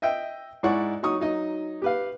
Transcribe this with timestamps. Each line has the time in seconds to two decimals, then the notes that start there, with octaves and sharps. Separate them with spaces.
0.02 D#5 E5 G5
0.63 G#2 E4 D5 F#5 C#6
1.03 F#3 D#4 C#6 D#6
1.20 F#3 D#4 D#5
1.82 G4 B4 F5